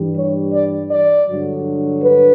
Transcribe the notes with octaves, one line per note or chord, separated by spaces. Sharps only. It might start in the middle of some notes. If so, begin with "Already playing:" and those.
Already playing: G2 E3 G3
C#5
D5
D5
G2 D3 F#3
B4